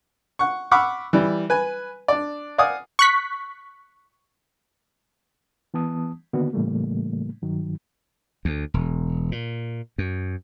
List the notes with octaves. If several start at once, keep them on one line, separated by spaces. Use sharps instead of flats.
F#5 C#6
F#5 B5 C#6 D6 E6 F6
E3 G3
B4 G#5
D4 D5
D5 F5 F#5 G#5 D#6
C#6 F#6 B6
E3 B3 A5 D#6
D3 D#3 A#3 B3 D4 F#4
A2 C#3 E3 G3 A3 A#3
G2 D#3 F#3
D2
E1
A#2
F#2